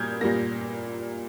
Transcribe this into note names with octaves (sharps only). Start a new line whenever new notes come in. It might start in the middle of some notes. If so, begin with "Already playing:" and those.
Already playing: A#2 G3 A#3 D#6 F6 G6 G#6
A#2 G3 A#3 A#6